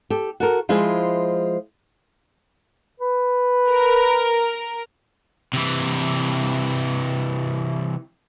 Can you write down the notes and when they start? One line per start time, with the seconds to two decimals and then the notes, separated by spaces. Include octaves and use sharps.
0.10 G4 A4
0.40 F#4 A4 A#4
0.69 F3 G#3 E4 F4 G#4 C5
3.00 B4
3.69 A#4
5.53 C3 E3